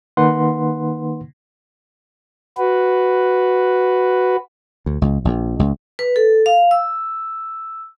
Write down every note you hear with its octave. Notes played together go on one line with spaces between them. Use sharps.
D#3 A#3 D#4 B4 F#5 C6
F#4 B4
D2
C#2
A#1
C#2
B4
A4
F5
E6